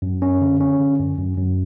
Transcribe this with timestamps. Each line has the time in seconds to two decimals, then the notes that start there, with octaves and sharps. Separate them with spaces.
0.02 F#2
0.22 C#4
0.41 D3
0.61 C#4
0.79 D3
0.99 F#2
1.18 F#2
1.37 F#2